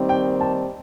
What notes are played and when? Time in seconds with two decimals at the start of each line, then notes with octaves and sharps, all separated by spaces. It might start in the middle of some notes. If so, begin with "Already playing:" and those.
Already playing: D#2 D#3 G3 C4
0.09 G5
0.41 A5